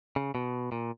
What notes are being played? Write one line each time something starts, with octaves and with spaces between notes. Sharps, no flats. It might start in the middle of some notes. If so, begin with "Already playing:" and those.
C#3
B2
A#2